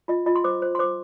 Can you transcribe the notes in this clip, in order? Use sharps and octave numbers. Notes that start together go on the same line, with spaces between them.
F4 D#5
F4 D#5
C6
C5 D6
C5
C6
C5 D6